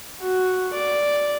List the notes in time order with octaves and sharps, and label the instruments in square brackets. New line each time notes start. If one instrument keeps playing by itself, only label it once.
[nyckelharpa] F#4
D5